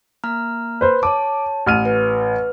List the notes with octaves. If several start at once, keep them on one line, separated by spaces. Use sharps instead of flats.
A#3 A#5 F6
B4 C5
C#5 A5 D6
A1 F6 D#7
B4